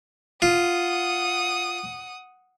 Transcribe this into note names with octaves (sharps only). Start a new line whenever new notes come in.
F4 F#5 D#6